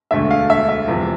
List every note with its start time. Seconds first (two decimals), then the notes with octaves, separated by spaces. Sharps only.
0.11 E1 D2 D3 A3 E5
0.31 F5
0.50 E5
0.69 E5
0.88 E1 E2 C3 F3